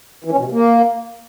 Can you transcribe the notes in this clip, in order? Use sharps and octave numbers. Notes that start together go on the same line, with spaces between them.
E3
C#4
B2
C3
A#3